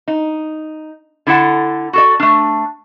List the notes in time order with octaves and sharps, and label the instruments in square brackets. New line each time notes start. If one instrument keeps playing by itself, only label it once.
[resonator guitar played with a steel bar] D#4
D3 E4 A4 F#5
F#4 A4 D5
A3 D4